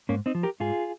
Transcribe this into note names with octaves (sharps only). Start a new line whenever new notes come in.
G#2 A#3 C#4
C4 D#4
F3
G4 A#4
G#2 F4 G#4